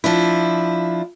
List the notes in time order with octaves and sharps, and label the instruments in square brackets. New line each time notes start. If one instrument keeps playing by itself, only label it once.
[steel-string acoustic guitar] F3 D4 E4